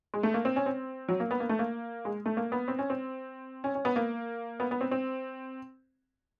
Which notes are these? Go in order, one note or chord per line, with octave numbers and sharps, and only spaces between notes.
G#3
A3
A#3
C4
C#4
C4
F#3
A#3
B3
A#3
A3
A#3
G#3
A3
A#3
B3
C4
C#4
C4
C#4
C#4
B3
A#3
B3
B3
C4
C4